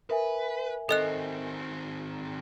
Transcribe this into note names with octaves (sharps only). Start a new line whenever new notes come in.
A#4 B4 E5 G#5
D#3 C4 A4 D#5 F#6